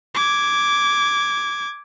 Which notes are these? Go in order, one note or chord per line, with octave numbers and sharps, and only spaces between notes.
D6 G#6